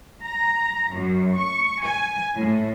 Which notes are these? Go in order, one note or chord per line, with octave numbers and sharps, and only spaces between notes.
A#5
F#2
C#6
G#5
A2